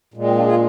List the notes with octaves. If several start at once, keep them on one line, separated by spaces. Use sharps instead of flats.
A#2 G#3
C4
D4 F4
F4 G#4